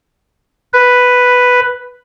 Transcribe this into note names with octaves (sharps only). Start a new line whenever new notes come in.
B4